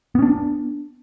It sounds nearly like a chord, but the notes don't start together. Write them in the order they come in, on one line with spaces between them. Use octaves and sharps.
B3 C#4 D4